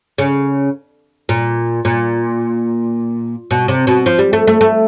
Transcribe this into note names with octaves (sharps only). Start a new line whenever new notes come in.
C#3
A#2
A#2
B2
C3
B2
F3
G3
A3
A3
A3